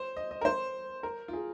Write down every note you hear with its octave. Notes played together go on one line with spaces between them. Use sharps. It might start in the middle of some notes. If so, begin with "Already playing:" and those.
Already playing: C5
D#5
D#5
A#4
C5
A#4
F4
G#4